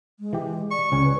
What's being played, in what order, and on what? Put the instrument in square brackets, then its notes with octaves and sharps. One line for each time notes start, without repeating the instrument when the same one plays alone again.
[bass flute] G#3
[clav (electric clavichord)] E3 G4
[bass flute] D5 [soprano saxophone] C#6
[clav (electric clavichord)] C#2 C#4 G#5 [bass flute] C#3
[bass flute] B4